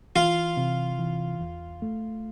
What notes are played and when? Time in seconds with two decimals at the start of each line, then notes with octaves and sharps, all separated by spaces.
0.16 E3 F4
0.57 C3
0.99 E3
1.41 E2
1.82 A3